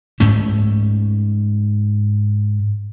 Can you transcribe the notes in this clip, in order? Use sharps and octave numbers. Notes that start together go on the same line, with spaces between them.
G#2 A3 C#4